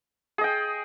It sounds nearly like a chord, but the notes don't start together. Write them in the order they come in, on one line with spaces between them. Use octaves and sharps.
G#4 D#5 G5